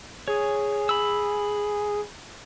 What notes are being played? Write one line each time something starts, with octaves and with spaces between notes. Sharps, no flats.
G#4 C#5
B5 E6